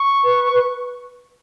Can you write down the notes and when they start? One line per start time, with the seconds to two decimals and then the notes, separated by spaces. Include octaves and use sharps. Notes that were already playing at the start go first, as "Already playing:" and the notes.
Already playing: C#6
0.24 B4
0.53 B4